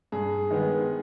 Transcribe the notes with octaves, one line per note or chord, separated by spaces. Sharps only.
G2 G#4
D#3 G#3 B3